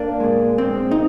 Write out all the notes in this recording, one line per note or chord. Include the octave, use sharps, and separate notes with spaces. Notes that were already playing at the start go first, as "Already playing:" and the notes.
Already playing: A#3 D4
A#2 G#3
A#2 G#3 C4
D#4